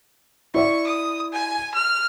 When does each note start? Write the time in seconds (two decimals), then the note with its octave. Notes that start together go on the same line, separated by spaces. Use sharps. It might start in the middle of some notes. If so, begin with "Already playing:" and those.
0.54 E4 D5 E5 C#6
0.87 D#6
1.33 G#5
1.75 F6